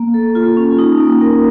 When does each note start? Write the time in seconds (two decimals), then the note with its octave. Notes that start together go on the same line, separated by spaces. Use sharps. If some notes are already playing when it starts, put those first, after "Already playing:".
Already playing: A#3
0.14 A4
0.35 F4
0.57 C#4
0.79 D#4
1.00 A#3
1.21 A#4